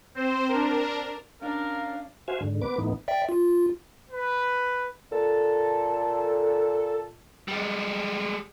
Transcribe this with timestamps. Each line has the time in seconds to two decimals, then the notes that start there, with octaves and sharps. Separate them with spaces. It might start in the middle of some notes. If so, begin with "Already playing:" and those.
0.15 C4 C5
0.48 D4 A#4
1.42 C#4 D4 A#4 F5
2.28 F#4 C5 E5 F5 G#5
2.41 G#2 D3
2.62 B3 B4 D6
2.78 A2 E3 B3 D#4
3.08 D5 E5 G5
3.29 F4
4.10 B4
5.12 A#2 A4
7.48 G3 G#3